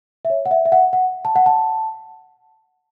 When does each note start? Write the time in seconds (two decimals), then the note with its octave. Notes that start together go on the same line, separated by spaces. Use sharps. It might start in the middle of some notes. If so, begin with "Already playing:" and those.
0.25 E5
0.30 C#5
0.46 F#5
0.51 E5
0.66 E5
0.72 F#5
0.93 F#5
1.25 A5
1.36 F#5
1.46 A5